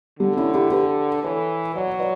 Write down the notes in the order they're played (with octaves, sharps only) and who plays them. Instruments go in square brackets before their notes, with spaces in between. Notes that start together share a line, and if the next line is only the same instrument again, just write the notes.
[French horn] D3 [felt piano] G3
[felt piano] C#4 E4
E4 G4
G4 B4
[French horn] E3 [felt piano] A4 C#5
[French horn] F#3 [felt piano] D5
[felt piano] C#5
B4 D5